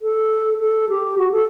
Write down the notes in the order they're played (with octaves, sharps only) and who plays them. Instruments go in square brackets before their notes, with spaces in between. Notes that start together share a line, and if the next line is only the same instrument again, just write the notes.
[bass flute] A4
A4
G4
F#4
A4